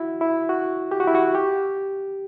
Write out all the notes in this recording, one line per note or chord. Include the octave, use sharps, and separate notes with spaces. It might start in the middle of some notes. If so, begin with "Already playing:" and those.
Already playing: E4 F#4
E4
F#4
G4
F#4
E4
F#4
G4